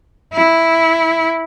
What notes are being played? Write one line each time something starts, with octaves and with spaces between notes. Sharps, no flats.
E4